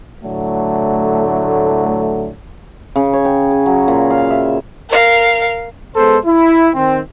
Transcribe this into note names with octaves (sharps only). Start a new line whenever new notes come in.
A2 D3 F#3 A3
C#3
C#5
G5
G#4
F#3
A#2
F5
E5
A#4 F5
G#3 B3 A4 C5
E4
D#3 C4